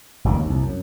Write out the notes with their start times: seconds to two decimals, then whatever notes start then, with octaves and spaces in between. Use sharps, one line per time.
0.24 G1 C#2 C3 D#3
0.37 D#2
0.50 C2
0.63 F#2